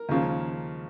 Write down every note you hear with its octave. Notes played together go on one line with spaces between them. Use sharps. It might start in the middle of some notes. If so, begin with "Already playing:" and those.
Already playing: A#4
D#2 C#3 F3